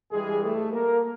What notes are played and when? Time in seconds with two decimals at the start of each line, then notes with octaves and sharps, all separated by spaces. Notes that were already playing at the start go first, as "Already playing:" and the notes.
0.11 G2 E3 G3 G#3 G#4
0.42 A3 A4
0.72 A#3 A#4